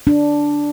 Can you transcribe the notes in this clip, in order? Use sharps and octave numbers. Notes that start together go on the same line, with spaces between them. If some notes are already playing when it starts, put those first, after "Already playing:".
D4